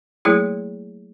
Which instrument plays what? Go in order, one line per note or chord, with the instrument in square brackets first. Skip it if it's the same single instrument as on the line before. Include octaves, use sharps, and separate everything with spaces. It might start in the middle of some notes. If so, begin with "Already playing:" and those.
[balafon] F#3 A3 A#3 E4 G#4